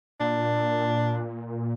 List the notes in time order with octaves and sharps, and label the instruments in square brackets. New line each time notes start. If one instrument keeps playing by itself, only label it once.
[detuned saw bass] A#2 [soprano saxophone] D4